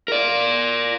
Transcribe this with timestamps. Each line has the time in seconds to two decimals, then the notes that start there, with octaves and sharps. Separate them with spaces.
0.08 A#4 D5